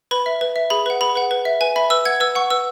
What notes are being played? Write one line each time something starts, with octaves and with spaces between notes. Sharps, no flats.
B4 B5
E5
B4
E5
G#4 B5
B4 F#5
G#4 B5
B4 F#5
B4
E5
B4 G#5
E5 B5
B4 E6
F#5 G#6
B4 E6
F#5 C#6
B4 E6